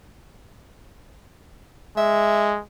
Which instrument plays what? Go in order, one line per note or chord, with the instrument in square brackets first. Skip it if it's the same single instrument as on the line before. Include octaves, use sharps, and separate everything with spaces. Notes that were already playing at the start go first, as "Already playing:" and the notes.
[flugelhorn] G#3 [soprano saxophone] E5